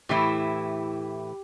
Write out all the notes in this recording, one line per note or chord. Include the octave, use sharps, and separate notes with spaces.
A2 E3 A3 E4 G4